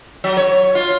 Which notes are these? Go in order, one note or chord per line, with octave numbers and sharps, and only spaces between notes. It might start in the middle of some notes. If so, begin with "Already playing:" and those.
F#3
C#5
F4